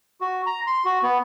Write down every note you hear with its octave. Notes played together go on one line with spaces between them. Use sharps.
F#4
A#5
C6
F#4
B3